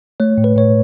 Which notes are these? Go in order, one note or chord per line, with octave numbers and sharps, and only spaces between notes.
A3 C#5
A2
B4
A2 C#5